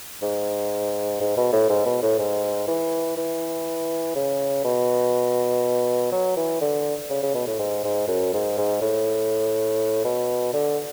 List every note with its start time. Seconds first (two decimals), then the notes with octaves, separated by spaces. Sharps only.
0.22 G#2
1.21 G#2
1.37 B2
1.52 A2
1.70 G#2
1.86 B2
2.02 A2
2.19 G#2
2.68 E3
3.17 E3
4.15 C#3
4.64 B2
6.12 F#3
6.37 E3
6.61 D3
7.10 C#3
7.23 C#3
7.34 B2
7.47 A2
7.59 G#2
7.84 G#2
8.08 F#2
8.33 G#2
8.58 G#2
8.82 A2
10.04 B2
10.54 D3